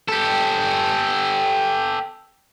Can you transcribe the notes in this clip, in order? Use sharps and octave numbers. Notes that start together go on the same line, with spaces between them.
G4 A4